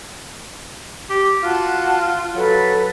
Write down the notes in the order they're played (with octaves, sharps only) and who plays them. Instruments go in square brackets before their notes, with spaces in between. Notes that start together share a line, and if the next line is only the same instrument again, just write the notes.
[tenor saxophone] G4
[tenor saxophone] F4 [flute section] F#4 A5 F#6
[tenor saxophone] F#3 [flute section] A4 B4